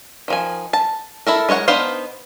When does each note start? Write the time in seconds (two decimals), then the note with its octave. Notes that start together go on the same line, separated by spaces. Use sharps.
0.28 D#3 F3 G#5
0.73 A5
1.27 E4 A4 A#4
1.49 G#3 A#4 C#5 F#5
1.68 B3 D4 D#4 C5 F5